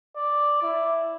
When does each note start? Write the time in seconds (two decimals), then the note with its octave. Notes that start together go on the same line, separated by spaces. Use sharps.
0.16 D5
0.63 E4